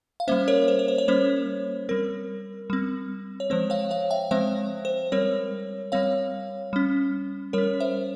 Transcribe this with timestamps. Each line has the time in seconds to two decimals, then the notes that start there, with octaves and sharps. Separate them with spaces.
0.20 F5
0.28 G3 A#3 C#4 C5 E5
0.48 A#4 C#5
0.68 C5
0.79 C#5
0.88 C5
0.98 C#5
1.08 G3 A#3 C#4 C5
1.89 G3 C4 A#4
2.70 G3 C4
3.40 C#5
3.50 F3 G#3 C4 C5
3.70 C#5 F5
3.91 C#5 F5
4.11 E5 G5
4.31 F3 G#3 C4 C5 E5
4.85 C5
5.12 G3 C4 A#4 C#5
5.92 G3 C4 C#5 F5
6.73 G3 C#4
7.53 G3 C#4 A#4 C#5
7.80 C5 E5